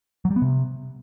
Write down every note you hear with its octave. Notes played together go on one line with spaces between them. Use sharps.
F#3
G3
B3
C3